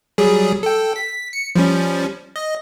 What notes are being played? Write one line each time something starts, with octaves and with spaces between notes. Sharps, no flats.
F#3 G3 G#4
A4 G5
B6
C#7
F3 G3 C#4
D#5